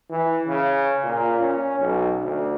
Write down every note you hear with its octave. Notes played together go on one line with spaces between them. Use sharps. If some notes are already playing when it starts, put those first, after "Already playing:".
E3
C#3
A#2
C#4
B1
D2